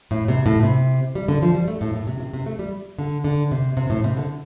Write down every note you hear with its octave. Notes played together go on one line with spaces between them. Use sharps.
A2
C3
A2
C3
G3
D3
F3
G3
A3
A2
A2
C3
C3
C3
A3
G3
D3
D3
C3
C3
A2
C3
D3